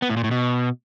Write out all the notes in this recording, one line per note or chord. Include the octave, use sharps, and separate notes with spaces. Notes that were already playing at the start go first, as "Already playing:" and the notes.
B3
A2
A#2
A2
B2